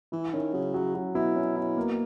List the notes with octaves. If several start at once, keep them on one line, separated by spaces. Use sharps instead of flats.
E3 E4
D#3 C#4
C#3 F#3
F#3
F#3
B2 E4
C#4
E4
A#3